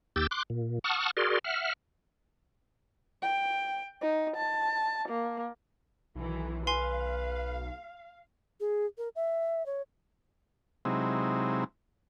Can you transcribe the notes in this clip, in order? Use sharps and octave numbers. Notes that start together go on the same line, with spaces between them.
D#2 G4 E6 G6 A6
C6 D6 F#6
A#2
F#5 A5 C#6 D#6 F6
F#4 G#4 A#4 D5 C6
E5 F#5 F6
G5
D#4
A5
A#3
B1 D#3 E3
B4 F5 G#5 C6 C7
G#4
A#4
E5
C#5
C3 F#3 G#3 C4 D#4 E4